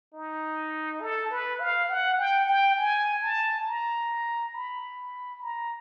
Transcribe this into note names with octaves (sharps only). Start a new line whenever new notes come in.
D#4
A4
B4
F5
F#5
G5
G5
G#5
A5
A#5
B5
A#5